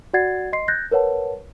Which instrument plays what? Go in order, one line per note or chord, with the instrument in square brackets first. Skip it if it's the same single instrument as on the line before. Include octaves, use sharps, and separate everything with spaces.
[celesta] F#4 D5 F#5 G#6 A6 C7
D#5 C6 C7
F#6 G6 A6 A#6
A#4 B4 C#5 F#5 A5